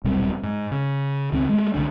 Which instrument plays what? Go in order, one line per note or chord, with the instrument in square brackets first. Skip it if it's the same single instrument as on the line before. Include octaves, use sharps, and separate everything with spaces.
[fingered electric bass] D#1 B1 C3 G3
G#2
C#3
C#2 D#3 C4
G#3 A3
C2 D3 D4